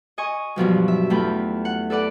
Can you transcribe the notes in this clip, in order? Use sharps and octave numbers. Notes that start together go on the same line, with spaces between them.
D#5 G#5 C#6
G2 B2 F3 F#3
E5
E2 A3 F4 G5 B5
F#5
A4 B4 D5 F#5